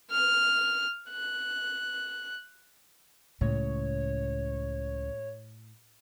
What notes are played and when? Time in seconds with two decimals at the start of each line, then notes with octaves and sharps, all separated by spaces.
0.11 F6
1.11 F#6
3.41 C#2 A2 C#5